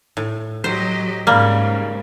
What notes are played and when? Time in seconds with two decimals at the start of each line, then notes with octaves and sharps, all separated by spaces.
0.17 A2
0.64 F#3 G4 C5 D#5
1.27 G#2 C#3 G3 A#3